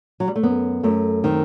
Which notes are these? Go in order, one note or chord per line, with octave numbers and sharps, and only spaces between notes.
F#3
G3
A3
F#2 B3
F#2 A3
D#3 C4